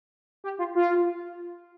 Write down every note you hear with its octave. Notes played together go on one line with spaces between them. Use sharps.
G4
F4
F4